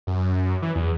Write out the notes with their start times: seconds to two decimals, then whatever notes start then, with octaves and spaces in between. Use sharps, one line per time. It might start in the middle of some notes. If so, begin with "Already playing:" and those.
0.07 F#2
0.62 E3
0.76 E2